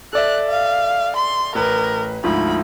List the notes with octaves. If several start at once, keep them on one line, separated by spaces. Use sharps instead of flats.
A4 D5 E5 F#6
F5
C6
A1 A#4 B4
D2 G#2 F3 B5